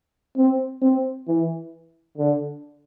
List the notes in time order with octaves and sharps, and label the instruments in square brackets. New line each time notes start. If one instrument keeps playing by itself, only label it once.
[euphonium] C4
C4
E3
D3